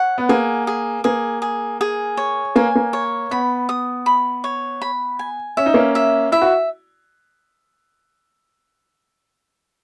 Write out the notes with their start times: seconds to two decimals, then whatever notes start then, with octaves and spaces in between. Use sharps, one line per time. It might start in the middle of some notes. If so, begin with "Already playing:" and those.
Already playing: C#5 F#5
0.18 B3
0.29 A#3 G#4
0.67 G#4
1.04 A#3 G#4
1.42 G#4
1.81 G#4
2.17 C#5
2.56 A#3 G#5
2.75 A#3
2.93 C#5
3.31 B3 B5
3.69 D#6
4.06 B5
4.44 C#5
4.82 B5
5.19 G#5
5.57 C#4 E5
5.66 D#4
5.74 A#3 C#4
5.95 E5
6.32 E4 E5
6.42 F#4